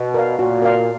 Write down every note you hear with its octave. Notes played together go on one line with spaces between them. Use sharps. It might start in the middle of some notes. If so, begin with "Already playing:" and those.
Already playing: B2
A#4 D5 F5
A#2 F#4
A#4 D5 F5